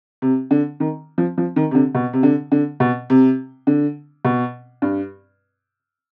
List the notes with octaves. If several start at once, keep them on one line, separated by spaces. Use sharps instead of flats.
C3
D3
D#3
F3
F3
D#3
C3
D3
B2
C3
D3
D3
B2
C3
D3
B2
G2